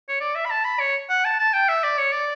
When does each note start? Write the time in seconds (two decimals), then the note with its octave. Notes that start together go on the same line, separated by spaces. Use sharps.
0.09 C#5
0.21 D5
0.35 E5
0.45 B5
0.51 A5
0.65 B5
0.80 C#5
1.10 F#5
1.25 A5
1.39 A5
1.53 G5
1.69 E5
1.84 D5
1.98 C#5
2.12 D5